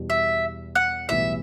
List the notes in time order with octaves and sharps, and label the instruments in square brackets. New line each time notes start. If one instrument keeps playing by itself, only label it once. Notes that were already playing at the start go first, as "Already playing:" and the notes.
Already playing: [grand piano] E2 B2 G3
[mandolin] E5
F#5
[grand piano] B1 A2 E3 G3 B3 [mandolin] E5